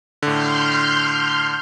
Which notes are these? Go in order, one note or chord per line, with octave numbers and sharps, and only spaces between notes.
A2 D3 C6 F6 G6